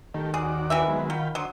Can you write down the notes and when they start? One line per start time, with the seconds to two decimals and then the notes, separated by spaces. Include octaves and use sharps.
0.14 D#3 A3 G4
0.34 D#2 F#4 G#4 D5
0.70 E3 C4 E5
0.88 F#3 G#3 B3
1.10 F#3 F4 G5 B5
1.35 D3 F#3 C5 D#6